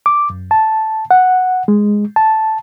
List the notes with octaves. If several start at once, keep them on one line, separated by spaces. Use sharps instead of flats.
D6
F#2
A5
F#5
G#3
A5